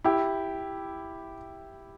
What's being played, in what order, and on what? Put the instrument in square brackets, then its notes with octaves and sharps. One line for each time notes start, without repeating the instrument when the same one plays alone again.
[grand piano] E4 G4